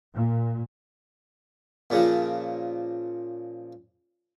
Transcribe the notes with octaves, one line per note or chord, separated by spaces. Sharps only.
A#2
A#2 C#3 F3